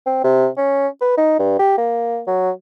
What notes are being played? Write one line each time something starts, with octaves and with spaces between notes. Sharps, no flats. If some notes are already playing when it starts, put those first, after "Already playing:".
C4
C3
C#4
B4
D#4
G2
G4
A#3
F#3